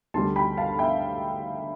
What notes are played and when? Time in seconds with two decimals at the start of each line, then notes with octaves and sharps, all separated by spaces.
0.14 D2 D3 G3 A5 C6
0.36 G5 B5
0.57 F5 A5
0.79 E5 G5